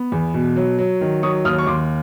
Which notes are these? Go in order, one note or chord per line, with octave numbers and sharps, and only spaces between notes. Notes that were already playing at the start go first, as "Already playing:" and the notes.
Already playing: B3
E2
B2
F#3
F#3
D#3
F#3 C#6 D#6
D#2 D#6 F6
C#6
D#2 C6 D6